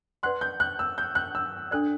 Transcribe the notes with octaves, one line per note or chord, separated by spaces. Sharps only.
B4 D5 F#5 C6 F#6
G6
F#6
E6
G6
F#6
E6
D4 A4 D5 F#6